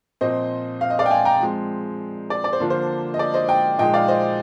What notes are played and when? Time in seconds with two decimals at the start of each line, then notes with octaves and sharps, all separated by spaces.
0.21 A#2 F3 C4 C5 D#5
0.81 F5
0.90 D#5
0.99 D5 F5
1.06 G5
1.10 F5 G#5
1.25 G5 A#5
1.40 F3 G#3 C4
2.30 D5
2.44 D5
2.53 C5
2.60 D3 F3 A#3 D4 F4
2.70 C5
3.14 D#5
3.19 D5
3.34 C5 D#5
3.49 D#5 G5
3.78 A#2 F3 G#3 D#4 D#5 G5
3.94 D5 F5
4.08 C5 D#5